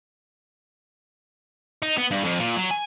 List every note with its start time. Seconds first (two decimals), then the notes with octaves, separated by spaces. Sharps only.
1.83 D#4
1.98 B3
2.11 G2
2.24 F2
2.40 A#2
2.57 F#3
2.71 G#5